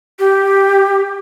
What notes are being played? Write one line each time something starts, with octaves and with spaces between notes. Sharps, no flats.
G4